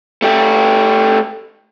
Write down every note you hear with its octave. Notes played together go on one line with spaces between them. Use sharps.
A3 G4